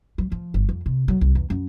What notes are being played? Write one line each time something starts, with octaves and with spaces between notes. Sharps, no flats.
F#3
F3
G1
F2
C3
F#3
C2
E2
F#2